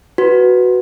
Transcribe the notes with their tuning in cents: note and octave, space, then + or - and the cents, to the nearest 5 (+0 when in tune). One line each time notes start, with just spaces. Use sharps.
F#4 +0 B4 +0